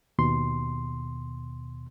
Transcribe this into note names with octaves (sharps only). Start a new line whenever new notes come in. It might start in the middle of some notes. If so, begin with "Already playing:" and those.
D#2 B2 C6